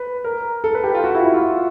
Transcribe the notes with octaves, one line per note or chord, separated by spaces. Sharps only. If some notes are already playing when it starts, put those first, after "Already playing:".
Already playing: B4
A#4
A4
B4
G4
F4
F#4
E4
E4
F4